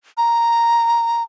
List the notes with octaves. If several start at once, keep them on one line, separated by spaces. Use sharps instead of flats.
A#5